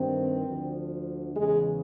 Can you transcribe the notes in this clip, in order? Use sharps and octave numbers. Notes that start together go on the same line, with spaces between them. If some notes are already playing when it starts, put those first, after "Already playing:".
Already playing: G2 D#3 C4
D2 D3 F3
E2 C#3 E3 G#3